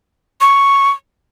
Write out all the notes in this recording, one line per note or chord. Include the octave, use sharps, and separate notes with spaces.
C#6